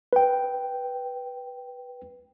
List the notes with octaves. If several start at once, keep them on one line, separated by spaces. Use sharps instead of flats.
B4 G5